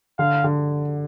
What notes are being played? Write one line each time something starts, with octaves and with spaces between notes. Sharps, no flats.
D3 F5
D3